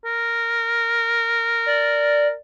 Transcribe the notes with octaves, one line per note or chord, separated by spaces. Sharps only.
A#4
D5